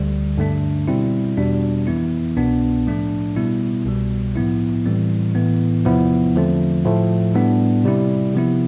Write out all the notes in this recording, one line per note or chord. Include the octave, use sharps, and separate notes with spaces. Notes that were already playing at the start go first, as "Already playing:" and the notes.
Already playing: D2 D3 G3
G2 D3 A3 D4
B2 G3 C4 E4
E2 B2 G3 D4
F2 E3 B3 E4
C2 B2 B3 D4
A2 F3 A3 D4
B2 G3 B3 E4
C2 B2 G3
A2 F3 B3 E4
A2 E3 G3 C4
A2 E3 B3
E2 C3 F3 B3 E4
E2 D3 F3 A3 C4
A2 F3 A3
A2 G3 B3 D4
C3 G3 C4 E4
C3 F3 B3 E4